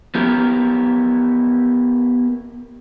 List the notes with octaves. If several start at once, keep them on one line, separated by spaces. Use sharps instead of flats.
B3 E4 G4 A#4